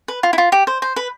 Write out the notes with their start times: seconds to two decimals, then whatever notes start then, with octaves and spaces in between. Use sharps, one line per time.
0.08 B4
0.23 F4
0.33 E4
0.38 F4
0.52 G4
0.67 C5
0.82 C5
0.96 B4